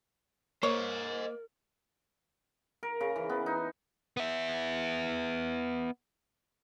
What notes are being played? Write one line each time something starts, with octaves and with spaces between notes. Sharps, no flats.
A#3 A#4 C5 C#5 D#5
A#4
C#3
E3
B3
D#4
B3 E5